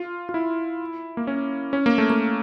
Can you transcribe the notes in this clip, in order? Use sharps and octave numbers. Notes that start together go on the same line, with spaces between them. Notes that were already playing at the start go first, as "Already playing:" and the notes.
Already playing: F4
F4
E4
A#3
C#4
C#4
A#3
A3
A#3